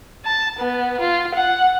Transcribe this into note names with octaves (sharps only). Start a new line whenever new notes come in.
A5
B3
F4
F#5